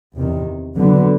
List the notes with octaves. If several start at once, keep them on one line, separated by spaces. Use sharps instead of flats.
E2 C3 D#3
D3 F#3 B3